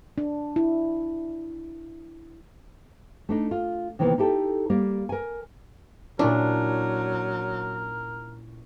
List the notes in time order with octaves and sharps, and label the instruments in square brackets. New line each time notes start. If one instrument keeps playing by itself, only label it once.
[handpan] D4
E4
[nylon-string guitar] A3 D4 D#4
F4
C3 D#3 E3 A#3 B3
D#4 E4 G4 A4
G3 A#3 D5
A#4 G#5
[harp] A#2 C#4 E4 [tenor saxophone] F#3 [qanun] D4 [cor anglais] A#4